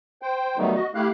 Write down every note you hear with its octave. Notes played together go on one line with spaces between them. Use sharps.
C5 G5
D#3 F#3 G3 A3 B3 D#4
F#4 D#5
A3 E4 G4 F5 F#6